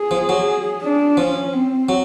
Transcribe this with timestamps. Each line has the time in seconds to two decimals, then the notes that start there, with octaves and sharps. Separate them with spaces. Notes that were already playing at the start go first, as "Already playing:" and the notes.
Already playing: G#4
0.11 F3
0.29 F#3
0.81 D4
1.17 F3 C#4
1.53 C4
1.89 F#3